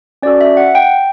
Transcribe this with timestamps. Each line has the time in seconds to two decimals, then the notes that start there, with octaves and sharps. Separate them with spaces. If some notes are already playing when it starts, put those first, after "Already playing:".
0.22 C#4 F#4 A4 D5
0.41 E5
0.57 F#5
0.75 G5